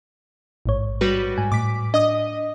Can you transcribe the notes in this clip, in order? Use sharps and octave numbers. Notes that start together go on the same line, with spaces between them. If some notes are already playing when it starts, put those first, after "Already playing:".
A1 G#2 C#5
G3 F#4 B4
G#2 G#5
A2 D6 B6
D4 D#5 D#6